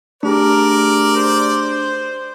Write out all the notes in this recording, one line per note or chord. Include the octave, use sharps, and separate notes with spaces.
A3 D4 G4 G#4 A#4 D5
C5